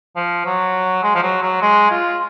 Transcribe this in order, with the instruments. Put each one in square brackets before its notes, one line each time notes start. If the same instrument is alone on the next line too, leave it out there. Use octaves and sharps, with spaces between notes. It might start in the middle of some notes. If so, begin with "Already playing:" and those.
[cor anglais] F3
F#3
G#3
F3
F#3
F#3
G#3
F4